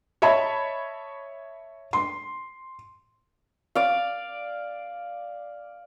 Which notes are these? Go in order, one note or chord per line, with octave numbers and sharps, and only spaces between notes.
C#5 D#5 E5 A5 B5
C6
D5 F5